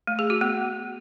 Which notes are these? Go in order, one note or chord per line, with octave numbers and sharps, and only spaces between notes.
A3
G#4
F#4
B3